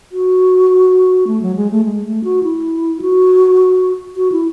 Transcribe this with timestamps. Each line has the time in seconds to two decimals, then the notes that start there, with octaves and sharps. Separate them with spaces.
0.12 F#4
1.27 A3
1.42 F#3
1.56 G#3
1.71 A3
1.85 G#3
2.05 A3
2.24 F#4
2.43 E4
3.02 F#4
4.17 F#4
4.32 E4